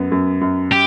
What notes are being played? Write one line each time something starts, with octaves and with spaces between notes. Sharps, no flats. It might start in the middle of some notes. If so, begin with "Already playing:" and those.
Already playing: F#2 B3
F#2
F#2
G4